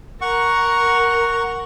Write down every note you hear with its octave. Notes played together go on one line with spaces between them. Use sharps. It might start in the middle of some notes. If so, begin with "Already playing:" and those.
A#4 F#5 C#6